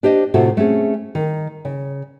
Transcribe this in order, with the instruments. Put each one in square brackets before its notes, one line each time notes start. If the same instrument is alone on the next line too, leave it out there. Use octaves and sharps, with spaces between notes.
[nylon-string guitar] D4 G4 C5 D#5
A2 C3 F4 F#4 A4 E5
A3 C4 C#4 G#4
D#3
C#3